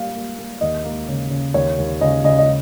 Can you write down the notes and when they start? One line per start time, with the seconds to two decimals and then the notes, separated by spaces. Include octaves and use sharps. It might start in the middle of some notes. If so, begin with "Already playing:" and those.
Already playing: G3 A#3 F5
0.14 A#3
0.38 A#3
0.61 D#2 D#5
0.84 A#3
1.08 C#3
1.31 C#3
1.54 D#2 C#5
1.78 D#2
2.01 C#3 D#5
2.24 C#3 D#5
2.38 D#5